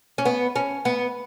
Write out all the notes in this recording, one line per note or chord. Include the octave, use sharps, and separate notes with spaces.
C#4
B3
C#4
B3